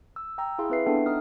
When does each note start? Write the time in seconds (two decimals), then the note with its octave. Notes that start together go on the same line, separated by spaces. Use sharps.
0.16 E6
0.38 G5 A#5 E6
0.59 E4 G#4 F5 C6
0.70 C4 E4 B4 E5 C7
0.86 B3 D4 A4 E5 G5
1.06 D#4 D#6 F6